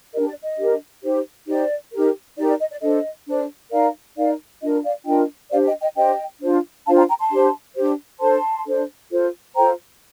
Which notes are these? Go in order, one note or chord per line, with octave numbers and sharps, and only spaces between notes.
D4 G4 A#4 D#5
D5
D#5
D4 G4 A#4
D#4 G4 C5
D#4 G4 C5 D5
D#4 G4 A#4
D#4 G4 A#4 D5
D5
D#5
D5
D4 A4 C5 D#5
D4 A4 C5
D#4 A#4 D5 F5
D#4 A#4 D5 F5
D4 F4 A#4 D#5
D5 F5
D4 F4 A#4 D#5 G5
D4 G4 C5 D5 F5
D#5 G5
D#5 G5
D4 G4 C5 D#5 G5
D4 F4 C5
D4 F4 C5 F5 A5
G5 A#5
G5 A#5
A5 C6
D4 G4 C5
D4 G4 C5
D4 A4 C5 A5 C6
D4 A4 C5
F4 A4 C5
F4 A4 C5 G5 A#5